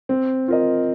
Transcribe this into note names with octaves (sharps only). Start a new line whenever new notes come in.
C4
F4 A#4 D#5